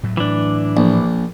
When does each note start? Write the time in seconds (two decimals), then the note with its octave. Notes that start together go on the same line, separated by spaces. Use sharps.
0.03 A2 F#3 A3
0.17 E3 D4
0.77 A#1